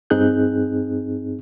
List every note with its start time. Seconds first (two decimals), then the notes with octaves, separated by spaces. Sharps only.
0.10 G2 C4 D#4 G#4 F#6 G6